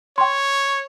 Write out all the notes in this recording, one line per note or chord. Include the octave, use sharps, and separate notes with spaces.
C#5 G5 C6